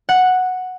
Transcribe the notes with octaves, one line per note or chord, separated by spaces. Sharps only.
F#5